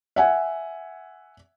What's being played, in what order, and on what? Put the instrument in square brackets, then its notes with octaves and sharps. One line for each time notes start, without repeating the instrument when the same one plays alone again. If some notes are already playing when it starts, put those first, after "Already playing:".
[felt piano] E5 F#5 G#5